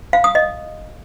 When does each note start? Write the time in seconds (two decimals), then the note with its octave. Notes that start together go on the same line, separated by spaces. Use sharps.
0.13 F5
0.24 D#6
0.35 D#5